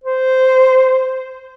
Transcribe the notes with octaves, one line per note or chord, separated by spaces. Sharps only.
C5